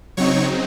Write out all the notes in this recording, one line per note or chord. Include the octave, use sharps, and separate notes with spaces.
C#3 F#3 C4 D#4 C#5 C#6